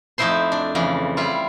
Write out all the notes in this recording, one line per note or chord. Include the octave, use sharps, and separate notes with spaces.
F2 A3 D#4 E4 C5 C6
D4
F2 C#3 E3
G3 E4 F4